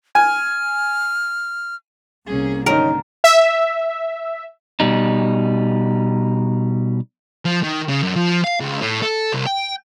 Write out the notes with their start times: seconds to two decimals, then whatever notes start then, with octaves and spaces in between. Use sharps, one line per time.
0.15 G#5 F6
2.26 C2 A#3 C#4 G#4
2.66 G#2 D3 D#3 C#4 D#4 A#4
3.24 E5
4.80 B2 G3 D#4
7.45 F3
7.63 D#3
7.88 C#3
8.03 F#2
8.16 F3
8.44 F5
8.60 C#2
8.81 A2
9.02 A4
9.33 C2
9.46 G5